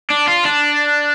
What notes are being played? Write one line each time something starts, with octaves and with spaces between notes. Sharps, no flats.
D4
F4
D4